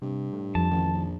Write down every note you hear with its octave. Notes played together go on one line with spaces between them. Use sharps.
G2 C3
A2
F2 A5
A1 D#3
A#1